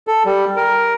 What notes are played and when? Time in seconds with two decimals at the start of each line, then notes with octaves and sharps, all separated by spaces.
0.07 A4
0.25 G3
0.56 A#4